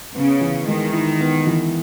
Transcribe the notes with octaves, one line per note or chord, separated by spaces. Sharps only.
C#3 B3
E3
D#3 G#3
E4
B3
E3